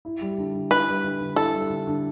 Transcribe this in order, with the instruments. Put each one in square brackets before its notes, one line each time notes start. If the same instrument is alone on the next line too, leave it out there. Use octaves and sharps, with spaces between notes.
[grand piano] E4
G3
D3
D3
[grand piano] E4 [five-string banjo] B4
[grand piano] G3
D3
D3
[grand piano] E4 [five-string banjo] A4
[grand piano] G3
D3
D3